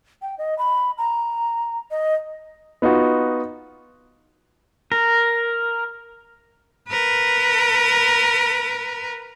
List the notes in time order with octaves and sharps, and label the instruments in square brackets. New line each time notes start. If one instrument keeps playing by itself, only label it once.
[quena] G5
D#5
B5
A#5
D#5
[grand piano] B3 D#4 F4 F#4
[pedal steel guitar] A#4
[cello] A#4 B4